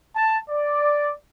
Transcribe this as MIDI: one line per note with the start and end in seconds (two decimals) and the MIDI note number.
0.15 0.37 81
0.50 1.11 74